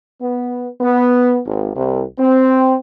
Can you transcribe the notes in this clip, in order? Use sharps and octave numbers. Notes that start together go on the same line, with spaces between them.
B3
B3
G#1
C2
C4